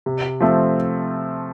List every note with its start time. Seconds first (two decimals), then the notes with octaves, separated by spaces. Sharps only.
0.06 C3
0.40 F3 A3 C4